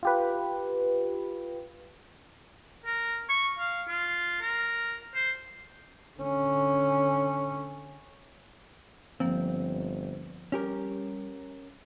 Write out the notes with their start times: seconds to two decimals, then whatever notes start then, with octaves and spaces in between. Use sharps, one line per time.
0.03 F4 G4 B4
2.85 A#4
3.29 C#6
3.59 F5
3.88 F4
4.42 A#4
5.15 C5
6.19 D3 C#4
9.20 G1 F3 A#3 C4
10.52 G3 C#4 G4 A#4